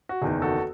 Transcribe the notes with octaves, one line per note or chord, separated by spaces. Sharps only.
F#4
F#1 E2 D#3 G#4
F#4 A4